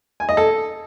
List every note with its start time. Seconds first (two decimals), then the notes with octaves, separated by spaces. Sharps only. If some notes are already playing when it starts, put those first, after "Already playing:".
0.20 G#5
0.29 D#5
0.37 A4